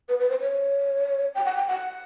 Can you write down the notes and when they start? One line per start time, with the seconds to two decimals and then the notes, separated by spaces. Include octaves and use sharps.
0.09 B4
0.19 B4
0.30 C5
0.40 C#5
1.35 G5
1.45 F#5
1.56 G5
1.67 F#5